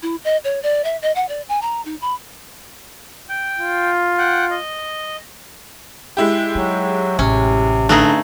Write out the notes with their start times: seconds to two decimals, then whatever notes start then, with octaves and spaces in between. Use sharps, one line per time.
0.03 E4
0.24 D#5
0.44 C#5
0.63 D5
0.84 E5
1.02 D#5
1.15 F#5
1.29 D5
1.49 G#5
1.62 A#5
1.85 D#4
2.01 B5
3.29 G5
3.59 F4
4.18 F#5 G5
4.50 D#5
6.17 G#3 E4 G4
6.55 F#3 D#4
7.19 A1 C3 C#4
7.89 G2 D3 A3 D#4 G#4 A#5